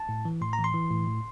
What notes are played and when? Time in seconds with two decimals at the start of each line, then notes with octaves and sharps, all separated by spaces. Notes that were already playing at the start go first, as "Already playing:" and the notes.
Already playing: A5
0.09 A2
0.25 E3
0.42 A2 C6
0.53 A#5
0.59 E3
0.64 C6
0.74 E3
0.91 A2
1.07 A2